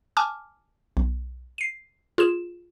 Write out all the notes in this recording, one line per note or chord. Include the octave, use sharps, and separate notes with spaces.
G#5 A5 D6 F6
B1
C7 D#7
F4 G#4 E7